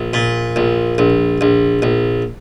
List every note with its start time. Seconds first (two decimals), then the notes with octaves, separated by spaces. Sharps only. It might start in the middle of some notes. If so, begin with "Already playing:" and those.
Already playing: A#1
0.14 A#2
0.56 A#1
0.98 A#1
1.41 A#1
1.82 A#1